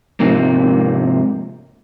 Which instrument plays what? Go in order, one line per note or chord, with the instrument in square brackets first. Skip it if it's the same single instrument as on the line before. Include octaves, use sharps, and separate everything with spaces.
[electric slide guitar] G#2 C3 F3 A#3